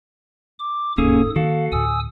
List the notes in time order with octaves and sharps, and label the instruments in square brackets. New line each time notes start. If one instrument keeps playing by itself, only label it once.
[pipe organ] D6
[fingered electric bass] E1 D#2 [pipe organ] G#2 A4 D#6 [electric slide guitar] A#3 C#4 G#4
[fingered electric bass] D#3 A#3 [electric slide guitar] F#4 A4 [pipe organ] F5
[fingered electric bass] D2 A2 [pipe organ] G#5 D#6 E6